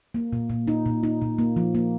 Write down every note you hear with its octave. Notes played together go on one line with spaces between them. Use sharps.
A#3
A#2
A#2
D#4
A#2
D#4
A#2
A#3
F3
A#3